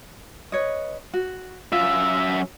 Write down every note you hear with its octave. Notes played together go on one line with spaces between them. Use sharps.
B4 C#5 D#5
F#4
F#2 F4 E5